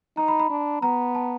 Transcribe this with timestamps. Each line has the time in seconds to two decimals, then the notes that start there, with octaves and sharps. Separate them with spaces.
0.17 D#4 A#5
0.28 B5
0.40 B5
0.50 D4
0.82 B3 A#5
1.15 A5